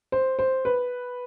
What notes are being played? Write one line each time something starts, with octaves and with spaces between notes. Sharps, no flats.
C5
C5
B4